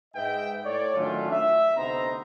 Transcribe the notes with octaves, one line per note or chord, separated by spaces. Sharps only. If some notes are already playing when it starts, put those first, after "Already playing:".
G#2 B4 D#5 E5 G5
A2 A4 C#5 D5
D#3 F#3 A3 C#4 D4 F4
E5
D2 C3 B3 D#4 C5 A#5